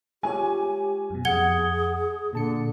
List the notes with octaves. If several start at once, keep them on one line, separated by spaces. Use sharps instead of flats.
G#3 F4 G4 C#5 G#5
F#2 B2
F2 G#4 F#5 G#6 G7
A#2 D3 A5 C#7